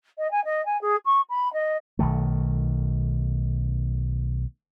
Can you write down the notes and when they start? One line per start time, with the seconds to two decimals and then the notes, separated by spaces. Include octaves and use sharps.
0.18 D#5
0.31 G#5
0.45 D#5
0.66 G#5
0.82 G#4
1.06 C#6
1.30 B5
1.53 D#5
1.99 B1 D#3 A3